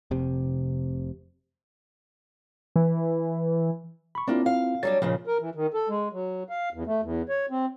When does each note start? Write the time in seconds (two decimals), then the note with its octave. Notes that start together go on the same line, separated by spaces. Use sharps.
0.11 F1 C3
2.76 E3
4.15 B5 C#6
4.28 A#3 C4 D4 E4 F4
4.46 F5
4.83 F#3 G3 D4 A6
5.02 D#2 A#2 C#3 F3
5.27 A#4
5.40 E3
5.55 D#3
5.74 A4
5.89 G#3
6.13 F#3
6.49 F5
6.74 E2
6.87 A3
7.03 E2
7.29 C#5
7.51 C4